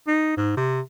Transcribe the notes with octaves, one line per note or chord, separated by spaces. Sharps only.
D#4
G#2
C3